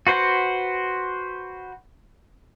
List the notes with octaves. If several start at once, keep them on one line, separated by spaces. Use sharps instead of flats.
F#4 B4 C5